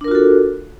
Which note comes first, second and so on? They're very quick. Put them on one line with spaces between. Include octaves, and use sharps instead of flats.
D4 A#4 F4 F#4 A4